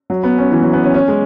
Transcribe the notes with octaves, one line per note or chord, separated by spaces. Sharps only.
F#3
B3
C#4
E3
F#3
B3
C#4
C#4
G#3